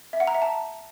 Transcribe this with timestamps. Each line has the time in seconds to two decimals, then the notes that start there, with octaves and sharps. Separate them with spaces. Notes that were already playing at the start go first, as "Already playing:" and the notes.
0.13 E5
0.20 F#5
0.27 A#5
0.35 E5
0.42 A5